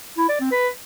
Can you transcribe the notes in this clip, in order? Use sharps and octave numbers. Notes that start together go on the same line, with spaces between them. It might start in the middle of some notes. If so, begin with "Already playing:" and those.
E4
D5
C4
B4